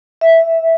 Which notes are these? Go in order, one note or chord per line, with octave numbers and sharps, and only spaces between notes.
E5